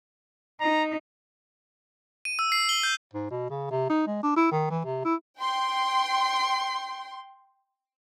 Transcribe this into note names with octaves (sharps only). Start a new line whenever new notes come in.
D#4 A#5
D#7
E6
C7
G7
G6
G#2
B2
C#3
C3
D#4
G#3
D4
E4
D#3
E3
C3
E4
G5 C6